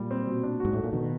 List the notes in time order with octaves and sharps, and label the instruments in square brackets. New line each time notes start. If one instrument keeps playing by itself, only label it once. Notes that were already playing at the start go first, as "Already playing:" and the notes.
Already playing: [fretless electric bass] A#2 [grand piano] G3
[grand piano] C4
B2
D4
[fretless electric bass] G#2 [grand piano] F#4
[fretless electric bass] A2 [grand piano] A3
[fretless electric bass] A#2
[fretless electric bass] B2 [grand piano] D#3